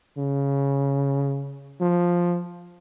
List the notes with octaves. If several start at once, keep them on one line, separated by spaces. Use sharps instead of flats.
C#3
F3